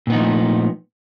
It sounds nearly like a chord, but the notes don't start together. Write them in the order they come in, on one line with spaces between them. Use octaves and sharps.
A#2 B3 D#4 F3 A3